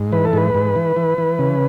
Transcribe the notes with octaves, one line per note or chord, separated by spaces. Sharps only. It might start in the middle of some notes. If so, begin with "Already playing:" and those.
Already playing: G#2
E3 B4
A4
G#2 B4
G#2
E3
E3
E3
C#3